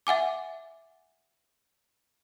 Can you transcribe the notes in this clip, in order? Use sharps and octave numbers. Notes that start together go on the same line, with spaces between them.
E5 F#5 G#5 D6